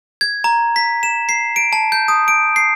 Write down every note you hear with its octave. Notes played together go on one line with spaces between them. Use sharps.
G#6
A#5
B6
E7
C7
D7
A5
G6
D#6
D7
C7